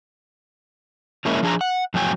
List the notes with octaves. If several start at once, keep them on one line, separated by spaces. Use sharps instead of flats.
F3 G#3 A#3 C#4 E4
F3 D4 G#4 G#5 A#5
F#5
F2 A2 F#3 G5 G#5